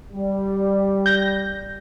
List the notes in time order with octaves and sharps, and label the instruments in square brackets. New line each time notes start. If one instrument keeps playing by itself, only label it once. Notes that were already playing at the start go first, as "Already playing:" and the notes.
[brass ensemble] G3
[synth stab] G6 A#6